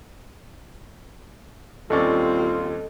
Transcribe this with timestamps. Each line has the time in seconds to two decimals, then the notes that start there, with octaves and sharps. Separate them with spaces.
1.90 D#2 G3 C4 C#4 F4 A4 D5 D#5